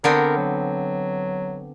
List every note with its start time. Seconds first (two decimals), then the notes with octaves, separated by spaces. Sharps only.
0.04 D3 B3 C4 A#4
0.37 F#3